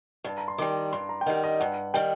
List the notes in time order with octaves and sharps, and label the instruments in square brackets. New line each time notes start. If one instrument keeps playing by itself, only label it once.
[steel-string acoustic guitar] G2 [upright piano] A5
[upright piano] A#5
C6
[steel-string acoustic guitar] D#3 G3 [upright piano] D6
[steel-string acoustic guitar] G2 [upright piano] C6
[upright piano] A#5
G5
[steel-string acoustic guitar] D#3 G3 [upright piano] F#5
[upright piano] D#5
[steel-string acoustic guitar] G2 [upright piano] F#5
[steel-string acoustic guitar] D#3 G3 [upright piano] G5